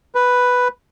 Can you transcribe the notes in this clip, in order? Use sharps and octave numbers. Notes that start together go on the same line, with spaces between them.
B4